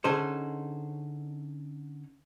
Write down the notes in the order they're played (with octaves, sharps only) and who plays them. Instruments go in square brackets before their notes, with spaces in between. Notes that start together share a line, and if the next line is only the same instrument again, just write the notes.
[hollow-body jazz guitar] D3 C#4 D#4 G#4 C5